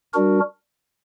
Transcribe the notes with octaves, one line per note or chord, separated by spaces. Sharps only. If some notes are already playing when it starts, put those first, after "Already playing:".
G3 D4 F#4 A#4